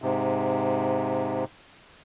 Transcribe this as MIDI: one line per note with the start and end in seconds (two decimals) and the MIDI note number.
0.02 1.44 44
0.02 1.44 48